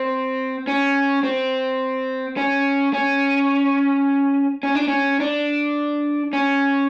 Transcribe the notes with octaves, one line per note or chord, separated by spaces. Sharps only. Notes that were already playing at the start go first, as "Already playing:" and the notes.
Already playing: C4
C#4
C4
C#4
C#4
C#4
D4
C#4
D4
C#4